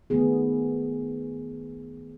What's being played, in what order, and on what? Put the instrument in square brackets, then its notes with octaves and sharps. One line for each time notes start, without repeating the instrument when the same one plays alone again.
[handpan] D#3 A3 B3 G#4